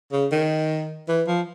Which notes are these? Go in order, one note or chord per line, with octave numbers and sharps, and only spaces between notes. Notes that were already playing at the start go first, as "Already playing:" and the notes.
C#3
D#3
E3
F3